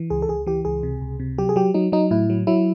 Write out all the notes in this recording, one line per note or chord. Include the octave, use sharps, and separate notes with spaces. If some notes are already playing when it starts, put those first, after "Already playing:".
Already playing: E3
C#2 G#4
A4
C#2 G#4
E3 G4
C#2 G#4
C3
C#2
C3
F#3 G4
G#4
F#3 G4
F#3 D#4
F#3 D#4
A2 E4
F#3
F#3 E4